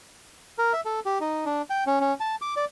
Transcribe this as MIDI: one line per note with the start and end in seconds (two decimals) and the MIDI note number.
0.59 0.73 70
0.73 0.81 76
0.85 1.00 69
1.05 1.19 67
1.21 1.45 63
1.46 1.62 62
1.70 1.84 79
1.87 2.00 61
2.00 2.14 61
2.20 2.35 81
2.42 2.54 86
2.57 2.65 74